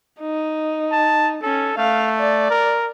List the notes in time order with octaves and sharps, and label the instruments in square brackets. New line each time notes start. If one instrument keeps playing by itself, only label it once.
[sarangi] D#4
[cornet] A5
[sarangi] C#4 [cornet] A4
[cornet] A3 [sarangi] F5
[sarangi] D5
[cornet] A#4